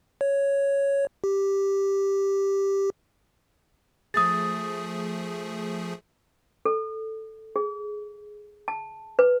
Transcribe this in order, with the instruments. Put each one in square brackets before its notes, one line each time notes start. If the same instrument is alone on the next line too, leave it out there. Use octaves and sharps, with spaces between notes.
[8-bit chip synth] C#5
G4
[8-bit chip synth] F3 A3 G#4 [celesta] D#6 A6
[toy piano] A4
G#4
A5
B4